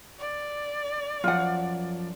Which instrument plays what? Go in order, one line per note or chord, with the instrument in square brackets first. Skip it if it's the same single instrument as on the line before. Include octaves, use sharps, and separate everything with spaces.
[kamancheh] D5
[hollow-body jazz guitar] F#2 F3 [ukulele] F4 F#5